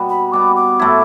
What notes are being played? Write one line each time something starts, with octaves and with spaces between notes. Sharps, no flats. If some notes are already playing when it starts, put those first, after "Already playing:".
Already playing: B2 G3 B3
B5
B2 G3 B3 D6
D6
A2 A3 E4